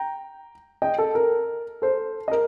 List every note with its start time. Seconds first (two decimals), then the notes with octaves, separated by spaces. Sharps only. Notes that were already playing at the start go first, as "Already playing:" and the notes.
Already playing: G5 A#5
0.82 D#5 G5
0.98 A4
1.15 A#4
1.82 A4 C5
2.28 D#5
2.31 A#4